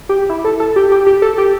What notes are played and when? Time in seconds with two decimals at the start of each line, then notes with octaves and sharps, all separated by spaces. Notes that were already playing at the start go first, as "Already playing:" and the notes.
0.09 G4
0.29 E4
0.45 A4
0.60 A4
0.76 G4
0.92 G4
1.06 G4
1.22 A4
1.38 G4